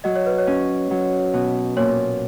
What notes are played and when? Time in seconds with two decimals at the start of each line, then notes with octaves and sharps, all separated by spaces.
0.04 F#3 D#5
0.16 C#5
0.27 B4
0.38 C#5
0.47 C#4
0.91 F#3
1.34 B2
1.76 A#2 C#5